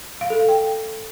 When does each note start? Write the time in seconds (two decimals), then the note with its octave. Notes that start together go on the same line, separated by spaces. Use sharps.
0.21 F5
0.30 A4
0.39 F5
0.49 G5